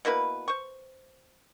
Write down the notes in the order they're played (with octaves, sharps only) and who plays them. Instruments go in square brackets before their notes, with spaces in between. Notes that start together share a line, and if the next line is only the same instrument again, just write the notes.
[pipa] B2 A#3 E4 B4
C5 C#6